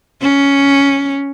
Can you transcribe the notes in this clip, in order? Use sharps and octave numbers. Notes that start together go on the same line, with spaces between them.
C#4